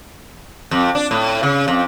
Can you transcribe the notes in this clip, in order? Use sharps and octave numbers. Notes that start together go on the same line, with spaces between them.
F2
D4
A2
C#3
F2